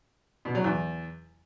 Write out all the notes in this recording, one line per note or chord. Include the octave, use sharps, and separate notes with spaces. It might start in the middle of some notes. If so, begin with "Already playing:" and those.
B2
F#3
E2